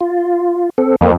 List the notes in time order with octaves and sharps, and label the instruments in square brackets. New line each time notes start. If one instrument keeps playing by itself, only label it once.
[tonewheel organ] F4
C4 A4
[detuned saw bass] F2 [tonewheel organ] A#3